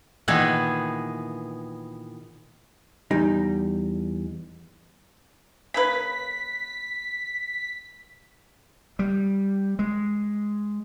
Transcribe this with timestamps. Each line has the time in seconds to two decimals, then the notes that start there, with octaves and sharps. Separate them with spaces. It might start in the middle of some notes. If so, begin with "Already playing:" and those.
0.28 A#2 D#3 E3 B3 G#4
3.11 E2 G3 D#4
5.74 C#3 A#3 B4 B6
8.99 G3
9.79 G#3